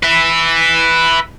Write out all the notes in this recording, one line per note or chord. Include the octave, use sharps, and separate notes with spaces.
B4 E5